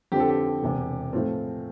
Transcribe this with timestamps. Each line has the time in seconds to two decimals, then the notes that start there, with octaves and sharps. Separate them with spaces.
0.12 F2 D3 F3 C4 G4
0.20 A4
0.29 G4
0.62 E1 E2 C3
1.13 A2 F3 C4 F4